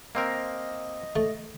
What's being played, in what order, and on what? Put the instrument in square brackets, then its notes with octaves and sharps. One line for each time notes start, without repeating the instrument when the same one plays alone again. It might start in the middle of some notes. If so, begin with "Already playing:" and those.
[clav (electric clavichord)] A#3 C4 A#4 [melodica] D#5
[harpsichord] A3